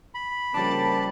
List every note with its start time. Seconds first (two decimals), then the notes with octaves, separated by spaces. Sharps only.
0.15 B5
0.54 C#3 F3 G3 A#3 D4 A5